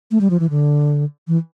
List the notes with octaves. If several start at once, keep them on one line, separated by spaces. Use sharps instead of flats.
A3
G3
F3
E3
D3
E3